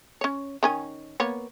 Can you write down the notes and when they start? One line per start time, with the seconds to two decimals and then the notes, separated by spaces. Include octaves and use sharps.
0.21 C#4 C#5
0.63 D#3 C#4 G#5
1.20 A#3 B3 C#5